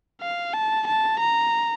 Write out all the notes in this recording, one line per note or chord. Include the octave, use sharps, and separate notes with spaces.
F5
A5
A5
A#5